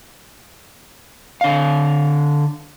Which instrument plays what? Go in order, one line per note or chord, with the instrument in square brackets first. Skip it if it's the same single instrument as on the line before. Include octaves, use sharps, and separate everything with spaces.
[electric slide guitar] D3 F5